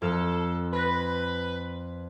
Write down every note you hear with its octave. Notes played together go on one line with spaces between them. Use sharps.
F2 A4 F6
B4 B5 A#6 B6